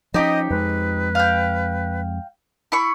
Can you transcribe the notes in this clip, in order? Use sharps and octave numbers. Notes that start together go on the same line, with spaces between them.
F3 C#4 D#4 G4 D#5
F2 G#3 B4
F5 G5
E4 B5 C#6